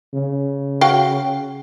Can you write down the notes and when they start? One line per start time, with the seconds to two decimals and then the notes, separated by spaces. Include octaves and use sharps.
0.14 C#3
0.81 F#4 F5 G5